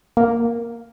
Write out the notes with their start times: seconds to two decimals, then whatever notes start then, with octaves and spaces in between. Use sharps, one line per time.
0.17 A#3